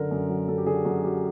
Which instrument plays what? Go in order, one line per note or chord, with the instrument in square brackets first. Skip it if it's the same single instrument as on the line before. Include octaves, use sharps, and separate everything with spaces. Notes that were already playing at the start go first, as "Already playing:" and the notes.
Already playing: [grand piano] F#2 D3 A#4
F#2
F#3
F#2 A4
G4
D3 G#4
F#2 F#4
F#3 G4